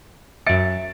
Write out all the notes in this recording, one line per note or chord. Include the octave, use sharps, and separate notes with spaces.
F#2 E5 A6 C#7 D7